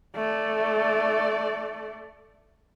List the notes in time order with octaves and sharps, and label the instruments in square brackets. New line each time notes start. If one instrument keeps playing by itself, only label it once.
[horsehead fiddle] A3 D5